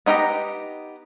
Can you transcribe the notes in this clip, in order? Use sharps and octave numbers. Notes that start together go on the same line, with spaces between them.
B3 D#4 G4 F5 A#5